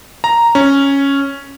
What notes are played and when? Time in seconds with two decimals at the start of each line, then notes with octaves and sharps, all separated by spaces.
0.24 A#5
0.55 C#4